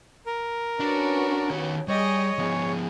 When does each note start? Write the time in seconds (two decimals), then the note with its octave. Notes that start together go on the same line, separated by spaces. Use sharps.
0.26 A#4
0.80 C#4 D4 F#4 B4
1.50 D#3 C#5
1.88 G3 G#4 C#5 D#5
2.39 F3 B3 G#4